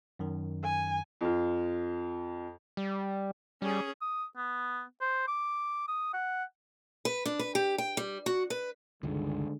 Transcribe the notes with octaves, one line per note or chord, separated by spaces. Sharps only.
F#2 D#3
G#5
F2 F4
G3
G3 C#4 G#4
D#6
B3
C5
D6
D#6
F#5
B4
D4
B4
G4
G5
G3
F#4
B4
C#2 G2 D3 D#3 G#3